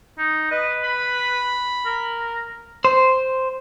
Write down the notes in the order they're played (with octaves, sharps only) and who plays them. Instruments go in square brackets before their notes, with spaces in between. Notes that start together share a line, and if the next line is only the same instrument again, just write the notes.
[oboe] D#4
[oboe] B4 [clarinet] D#5
[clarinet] B5
[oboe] A#4
[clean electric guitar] C5